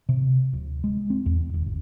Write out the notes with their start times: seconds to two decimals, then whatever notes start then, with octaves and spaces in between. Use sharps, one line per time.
0.09 C3
0.53 D1
0.84 G#3
1.10 C4
1.26 E2
1.54 D#1
1.66 G1